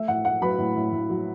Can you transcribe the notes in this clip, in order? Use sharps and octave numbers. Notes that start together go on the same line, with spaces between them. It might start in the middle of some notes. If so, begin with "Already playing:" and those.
Already playing: A3 E5
A2 F#5
A3 F#5
F#3 B4 B5
A2
A2
A2
F#3